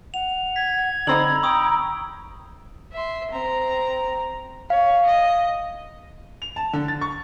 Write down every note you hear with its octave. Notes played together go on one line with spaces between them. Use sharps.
F#5 F7
G#6 B6
D3 C4 D#4 A#5 B5 E6 F#7
G5 C#6 D#6 E6
E5 C6
C4 A#5
C#5 F5
D#5
F7
A5
D3
A6
C#6